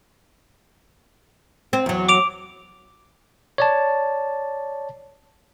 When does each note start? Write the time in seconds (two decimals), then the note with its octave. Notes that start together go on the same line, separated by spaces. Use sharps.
1.73 C4
1.86 E2 F#3
2.09 D6 D7 F7
3.58 C#5 D5 A5